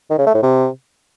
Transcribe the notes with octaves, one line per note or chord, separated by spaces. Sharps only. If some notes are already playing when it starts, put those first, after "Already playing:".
D#3
C#3
A3
A2
C3